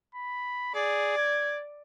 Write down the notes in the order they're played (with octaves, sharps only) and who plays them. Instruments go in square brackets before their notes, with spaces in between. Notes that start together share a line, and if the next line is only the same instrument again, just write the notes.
[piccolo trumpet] B5
[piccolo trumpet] G#4 [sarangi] D5
[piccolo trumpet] G#6